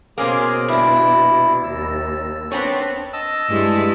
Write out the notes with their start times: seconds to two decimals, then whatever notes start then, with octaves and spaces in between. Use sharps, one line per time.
0.18 B2 A#3 C#4 G#4 C5 D6
0.68 G2 D4 E4
1.64 D#2 E6
2.52 B3 C4 D4 C#5
3.13 D#5 A5 E6
3.49 G2 G#3 E4